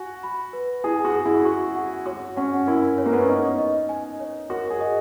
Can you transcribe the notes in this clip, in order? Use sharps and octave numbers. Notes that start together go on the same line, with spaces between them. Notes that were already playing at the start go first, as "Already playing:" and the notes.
Already playing: F#4 G#5
B5
B4
E4 G#4
F#4
G#4
E4
F#4 C#6
F#5
F#4 C#5
C#4 F#5
E4 A#4
C#5
A#3
B3
C#4
D#4 C#6
D#5
G#5
C#5
F#4 A#4
G#4
D#5